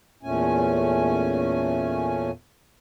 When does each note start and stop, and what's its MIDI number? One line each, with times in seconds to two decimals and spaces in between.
0.23 2.31 40
0.23 2.31 46
0.23 2.31 57
0.23 2.31 61
0.23 2.31 80